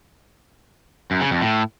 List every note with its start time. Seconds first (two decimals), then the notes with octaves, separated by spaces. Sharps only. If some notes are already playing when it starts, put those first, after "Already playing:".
1.11 F#2
1.21 C#3
1.31 F2
1.42 A2